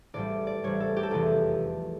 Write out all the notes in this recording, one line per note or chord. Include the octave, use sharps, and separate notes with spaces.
A1 A2 G3 D5
D5
A1 A2 G3 C#5
A4
G4
A4
F1 E2 E3 G4